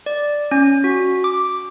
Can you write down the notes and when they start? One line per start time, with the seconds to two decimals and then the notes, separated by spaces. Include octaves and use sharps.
0.06 D5
0.51 C#4
0.84 F#4
1.24 D6